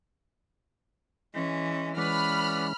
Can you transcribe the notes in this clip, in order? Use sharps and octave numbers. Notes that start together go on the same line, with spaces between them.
E3 G#3 C#4
E3 G#3 C#4 B4 D5 F#5 B5 F6